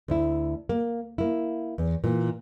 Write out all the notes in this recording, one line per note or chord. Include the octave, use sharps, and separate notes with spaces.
D2 E4
A#3
A#3 E4
E2
A#2 E3